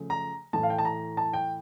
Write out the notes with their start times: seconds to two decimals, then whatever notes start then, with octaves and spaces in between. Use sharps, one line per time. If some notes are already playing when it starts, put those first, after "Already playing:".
Already playing: C#3 F3 A3
0.10 A#5
0.53 A2 E3 A3 A5
0.63 F5
0.70 G5
0.79 A5
0.85 A#5
1.17 A5
1.33 G5